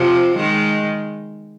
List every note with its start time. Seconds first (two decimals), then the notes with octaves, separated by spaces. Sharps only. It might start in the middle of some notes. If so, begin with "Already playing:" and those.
Already playing: C3 F3
0.36 D#3 G#3